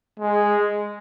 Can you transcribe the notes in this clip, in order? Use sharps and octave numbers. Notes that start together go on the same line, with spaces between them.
G#3